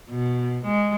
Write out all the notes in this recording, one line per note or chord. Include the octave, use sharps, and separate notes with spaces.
B2
G#3